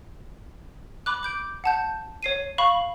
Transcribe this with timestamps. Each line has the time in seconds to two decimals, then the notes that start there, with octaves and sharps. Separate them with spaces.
1.06 B5 D6 F#6
1.23 D6 G6 D7
1.64 F#5 A5 G6
2.23 C#5 C7 D#7
2.58 F5 B5 C#6